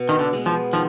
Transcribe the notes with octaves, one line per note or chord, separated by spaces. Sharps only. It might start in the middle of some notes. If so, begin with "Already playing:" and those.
Already playing: B2
D#3
D3
G#3 B3
F3
D#3 F3